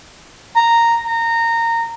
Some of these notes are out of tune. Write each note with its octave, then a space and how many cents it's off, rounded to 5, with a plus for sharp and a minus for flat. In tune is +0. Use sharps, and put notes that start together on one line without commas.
A#5 -5
A#5 -20